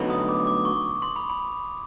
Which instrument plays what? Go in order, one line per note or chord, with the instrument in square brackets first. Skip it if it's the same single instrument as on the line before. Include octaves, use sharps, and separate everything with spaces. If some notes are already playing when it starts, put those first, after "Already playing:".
Already playing: [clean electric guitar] D2 D3 F#3 B3 D#4
[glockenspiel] D#6
D6
D6
C#6
C#6
C6
B5
B5